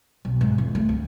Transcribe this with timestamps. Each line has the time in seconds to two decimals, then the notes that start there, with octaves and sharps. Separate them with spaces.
0.25 B1
0.41 G#2
0.58 E2
0.75 A3
0.89 D2